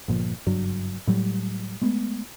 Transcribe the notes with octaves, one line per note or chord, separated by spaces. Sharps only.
G1 A#2 F3
F#1 G2 F#3
A2 F#3 G3
G#3 A3 B3